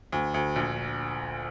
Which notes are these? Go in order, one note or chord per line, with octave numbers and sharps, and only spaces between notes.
D2
D2
A#1